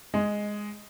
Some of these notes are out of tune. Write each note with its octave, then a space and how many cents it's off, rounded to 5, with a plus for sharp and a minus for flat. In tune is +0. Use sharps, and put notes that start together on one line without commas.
G#3 +0